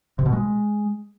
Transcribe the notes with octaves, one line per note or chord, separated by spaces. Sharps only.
C3
B2
G#3